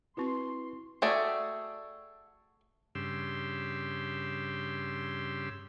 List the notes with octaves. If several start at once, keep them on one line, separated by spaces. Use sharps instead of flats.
C4 E4 F#4 B4 C6 C#6
A3 F#4 G#4 D5 E5 G5
G2 C#3 G4 C6 E6